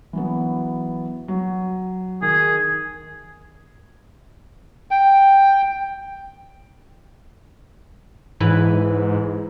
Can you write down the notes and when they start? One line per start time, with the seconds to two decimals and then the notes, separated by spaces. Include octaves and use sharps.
0.13 E3 F#3 B3
1.28 F#3
2.22 D#3 G#4
4.91 G5
8.40 G#2 E3 B4 B5